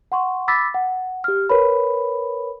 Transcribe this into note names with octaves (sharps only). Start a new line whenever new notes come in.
F#5 C6 C#6
B5 D6 E6 A6 B6
F#5
G4 F6
A#4 B4 C#5 B5